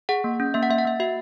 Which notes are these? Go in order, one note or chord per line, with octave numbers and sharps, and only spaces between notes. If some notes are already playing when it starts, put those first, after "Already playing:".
G#4 F#5
A#3
C#4
A#3 E5
F#5
A#3 E5
F#5
A#3 E5
F#4 E5